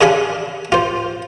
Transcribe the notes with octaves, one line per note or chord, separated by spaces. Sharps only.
C#3 D4 G#4 F5 B5
F4 C5